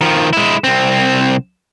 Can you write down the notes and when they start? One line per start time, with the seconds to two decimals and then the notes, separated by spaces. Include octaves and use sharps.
0.01 D#3 F3
0.33 G#3 E4
0.64 C2 C4